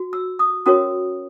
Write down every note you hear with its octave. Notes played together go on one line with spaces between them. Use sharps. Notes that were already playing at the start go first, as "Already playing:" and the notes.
Already playing: F#4
E6
D#6
C#4 F#4 A#4 C#5 D#6